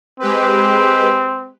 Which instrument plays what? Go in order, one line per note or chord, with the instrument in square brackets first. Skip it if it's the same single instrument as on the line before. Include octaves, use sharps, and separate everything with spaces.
[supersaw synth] G#3 G4 B4 [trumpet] C4